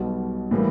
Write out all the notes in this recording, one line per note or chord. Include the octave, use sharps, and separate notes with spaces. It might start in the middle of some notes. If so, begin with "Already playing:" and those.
Already playing: B1 B2 G3
A2 E3 G3 A#3